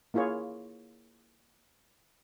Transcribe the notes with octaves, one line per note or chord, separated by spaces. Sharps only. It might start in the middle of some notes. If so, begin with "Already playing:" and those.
A#3 E4 F4 G#4 C#5